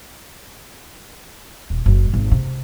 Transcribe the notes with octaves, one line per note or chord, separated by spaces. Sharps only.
D#1
F#1
G#1
C3